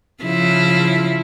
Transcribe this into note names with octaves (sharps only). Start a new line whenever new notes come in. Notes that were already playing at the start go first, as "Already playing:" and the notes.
C#3 F3 E4